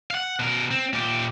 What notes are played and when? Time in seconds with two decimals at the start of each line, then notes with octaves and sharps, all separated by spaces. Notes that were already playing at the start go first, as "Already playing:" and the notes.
0.10 F5 F#5
0.39 B2 A#4
0.71 C4
0.93 A#2 G4